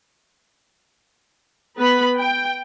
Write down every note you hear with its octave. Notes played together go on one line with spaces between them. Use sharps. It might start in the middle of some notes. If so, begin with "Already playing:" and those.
B3 B4 B5
G5